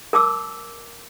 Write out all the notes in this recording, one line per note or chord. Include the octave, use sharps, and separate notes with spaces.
A#4 A5 D6 E6